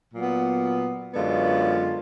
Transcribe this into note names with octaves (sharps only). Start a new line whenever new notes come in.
A#2 F#3 B3
F#2 D3 G#3 B3 F4